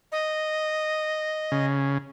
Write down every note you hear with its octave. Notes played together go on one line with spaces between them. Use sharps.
D#5
C#3